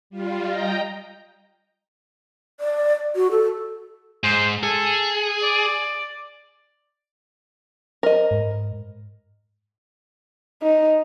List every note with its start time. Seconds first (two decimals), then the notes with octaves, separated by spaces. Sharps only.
0.10 G3 F4
0.48 D#5 G5 A#5
2.60 D5
3.16 F#4
3.31 A4
4.24 G#2 C5
4.63 G#4 A4
5.43 D5
8.03 A#4 C5 D#5
8.31 G#2
10.62 D#4